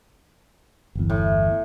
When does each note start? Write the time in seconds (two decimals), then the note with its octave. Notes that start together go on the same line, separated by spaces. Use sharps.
0.95 G1 E2
1.10 A2